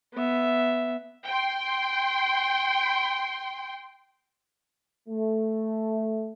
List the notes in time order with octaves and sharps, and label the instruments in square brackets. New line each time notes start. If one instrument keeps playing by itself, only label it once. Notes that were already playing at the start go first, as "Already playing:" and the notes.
[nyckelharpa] B3 E5
[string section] G5 C6
[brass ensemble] A3